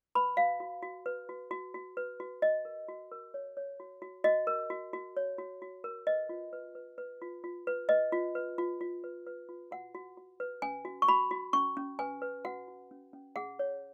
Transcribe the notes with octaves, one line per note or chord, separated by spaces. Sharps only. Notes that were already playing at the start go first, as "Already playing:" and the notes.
B4 B5
F#4 F5
F#4
F#4
B4
F#4
F#4
F#4
B4
F#4
F#4 D#5
A#4
F#4
A#4
C#5
C#5
F#4
F#4
F#4 D#5
A#4
F#4
F#4
C#5
F#4
F#4
A#4
B4 D#5
F4
B4
B4
B4
F4
F4
B4
B4 D#5
F4
B4
F4
F4
B4
B4
F4
F#4 F#5
F#4
F#4
B4
C#4 G#5
F#4
C#6
F#4 B5
F#4
C#4 C#6
C#4
B4 G#5
B4
F#4 F#5
F#4
C#4
C#4
G#4 F#5
C#5